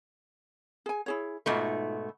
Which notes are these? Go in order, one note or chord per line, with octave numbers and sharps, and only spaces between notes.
G#4 G#5
E4 G#4 C#5
G#2 B2 A3 D#4 F4